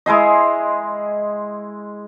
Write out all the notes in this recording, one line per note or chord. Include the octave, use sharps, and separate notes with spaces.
G#3 E4 G#4 D#5